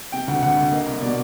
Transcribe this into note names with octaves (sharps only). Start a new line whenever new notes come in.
C3 G5
D2 F#5
D2 F#5
D2
A#3 D#5
C2
B2 D5